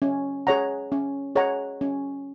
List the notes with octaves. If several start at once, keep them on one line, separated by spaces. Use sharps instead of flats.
C#4
G#4 C#5 F#5 A#5
C#4
G#4 C#5 F#5 A#5
C#4